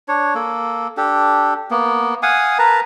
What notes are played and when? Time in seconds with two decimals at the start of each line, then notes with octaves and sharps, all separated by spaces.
0.08 D4 C#5
0.35 A#3 A4
0.97 D4 G4 A4
1.71 A#3 B3
2.23 F5 F#5 G#5 D#6
2.59 A#4 B4 A5 A#5